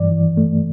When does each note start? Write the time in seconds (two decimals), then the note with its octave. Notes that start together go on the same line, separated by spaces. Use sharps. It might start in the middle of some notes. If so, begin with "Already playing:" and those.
Already playing: G2 E3 D5
0.11 E3
0.37 A3